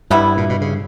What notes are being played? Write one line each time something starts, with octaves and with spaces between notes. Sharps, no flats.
G2 G3 B3 E4
A#2
B2
C#3